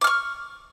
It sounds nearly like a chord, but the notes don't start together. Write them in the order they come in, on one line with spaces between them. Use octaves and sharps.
D6 F6 C#6